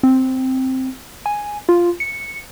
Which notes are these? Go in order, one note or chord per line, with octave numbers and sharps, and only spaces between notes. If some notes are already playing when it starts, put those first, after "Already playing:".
C4
G#5
F4
C#7